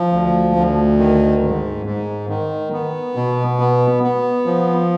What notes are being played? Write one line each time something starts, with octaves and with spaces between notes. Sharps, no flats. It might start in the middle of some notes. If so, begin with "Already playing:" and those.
Already playing: F3
D2
D2
D#3
G#2
G#2
D#3
B3
B2
B3
B3
F3